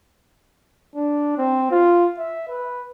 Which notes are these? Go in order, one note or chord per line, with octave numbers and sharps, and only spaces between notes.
D4
C4
F4
E5
B4